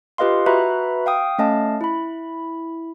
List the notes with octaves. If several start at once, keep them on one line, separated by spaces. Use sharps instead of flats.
F4 G4 B4 D#5 F5 C6
F#4 B4 E5 A#5 B5 F#6
F5 G5 D#6
A3 C#4 D#5 F5 A5
E4 B5